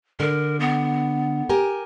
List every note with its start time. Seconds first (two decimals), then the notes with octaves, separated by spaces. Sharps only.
0.20 D3 A#4
0.60 B3
1.49 G4 A#4 G#5